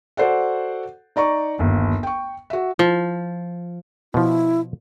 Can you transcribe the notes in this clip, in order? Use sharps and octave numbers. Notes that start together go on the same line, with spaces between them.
F#4 A4 C5 D5 F#5
D#4 D5 A#5 C#6
G1 D#2
G5 C#6
F#4 E5
F3
B2 F3 E4